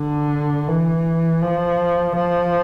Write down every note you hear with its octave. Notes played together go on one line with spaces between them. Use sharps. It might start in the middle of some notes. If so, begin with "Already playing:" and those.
Already playing: D3
E3
F3
F3